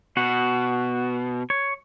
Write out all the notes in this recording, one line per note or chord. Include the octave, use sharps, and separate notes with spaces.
B2 F#4
C#5